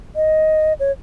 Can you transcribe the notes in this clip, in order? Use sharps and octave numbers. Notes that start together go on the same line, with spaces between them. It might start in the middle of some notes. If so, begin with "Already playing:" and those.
D#5
C#5